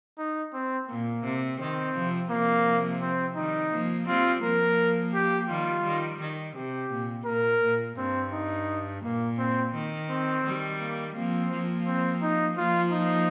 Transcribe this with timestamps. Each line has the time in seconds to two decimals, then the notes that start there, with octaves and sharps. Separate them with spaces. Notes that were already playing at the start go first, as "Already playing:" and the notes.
0.18 D#4
0.53 C4
0.88 A#2 A#3
1.24 C3
1.59 D#3 C4
1.95 C3 F3
2.30 C3 F3 A#3
3.01 C4
3.36 D#3 G3 D#4
3.72 F3 A#3
4.07 G3 C4 F4
4.42 F3 A#3 A#4
5.14 G4
5.49 D#3 G3 F4
5.84 D#3 G3
6.20 D#3
6.56 C3 G4
6.90 A#2
7.26 A#2 A#4
7.62 A#2
7.97 G2 C4
8.33 D#4
9.04 A#2 A#3
9.38 C4
9.74 D#3
10.09 C4
10.44 D#3 G3
10.80 A#3
11.15 F3 A#3 C4
11.51 F3 A#3
11.86 C4
12.22 D#4
12.57 F3 A#3 F4
12.93 D#4